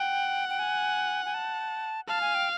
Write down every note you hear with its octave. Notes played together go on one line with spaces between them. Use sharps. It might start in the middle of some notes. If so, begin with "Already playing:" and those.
Already playing: F#5 G5
G5
G#5
G#5
A5
F5 A5
G#5
G5